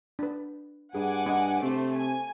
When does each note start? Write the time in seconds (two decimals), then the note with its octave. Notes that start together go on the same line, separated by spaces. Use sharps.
0.19 D4 B4
0.94 G2 G#4 F#5 G#5 D6
1.26 D4 D#5
1.63 C3 A3 C5
1.94 G#5